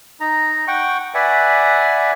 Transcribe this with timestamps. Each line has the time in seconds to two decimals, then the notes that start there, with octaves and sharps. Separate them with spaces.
0.20 D#4 A#5
0.68 F#5 G5 C#6
1.15 B4 D5 E5 F#5 G#5